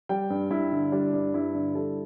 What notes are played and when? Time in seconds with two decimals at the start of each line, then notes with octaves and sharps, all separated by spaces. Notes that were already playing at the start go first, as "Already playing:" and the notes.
0.09 G3 G5
0.30 G2
0.50 G2 E4
0.72 D3
0.92 G3 D4
1.14 G2
1.34 G2 E4
1.55 D3
1.75 G3 A4